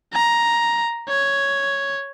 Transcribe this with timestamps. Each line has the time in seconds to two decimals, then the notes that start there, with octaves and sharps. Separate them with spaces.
0.13 A#5
1.09 C#5